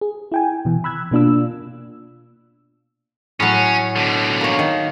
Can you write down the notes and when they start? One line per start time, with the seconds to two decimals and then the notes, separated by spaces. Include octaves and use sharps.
0.01 G#4
0.32 E4 G5 G#5
0.65 B2 E3
0.84 B5 E6 F#6 G#6
1.11 B2 A#3 D4 F4 E6
3.40 A2 F#3 C#4
3.96 B2 D3
4.41 A#3 C#5
4.59 D#3